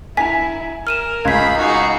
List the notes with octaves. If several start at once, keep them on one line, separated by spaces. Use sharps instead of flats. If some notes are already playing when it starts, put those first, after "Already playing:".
E4 G#5 A#5 B6
A#4 F6 D#7 E7
C#2 G#4 B5 G#6 B6
D#4 F#4 G#4